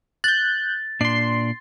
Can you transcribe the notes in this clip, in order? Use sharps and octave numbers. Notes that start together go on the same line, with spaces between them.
F#6 G6 A6
A#2 D4 D5 C6 C7